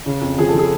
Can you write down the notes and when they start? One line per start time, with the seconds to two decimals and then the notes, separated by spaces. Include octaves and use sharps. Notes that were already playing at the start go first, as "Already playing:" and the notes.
0.06 C#3
0.21 F2
0.38 F3 G#4
0.49 A4
0.54 F3
0.59 G#4